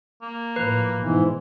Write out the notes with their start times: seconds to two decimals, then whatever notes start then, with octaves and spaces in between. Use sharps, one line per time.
0.22 A#3
0.56 A2 F3 B4
1.00 G#2 B2 E3